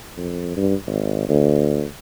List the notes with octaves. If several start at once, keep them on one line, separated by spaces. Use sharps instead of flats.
F2
G2
G#1
D2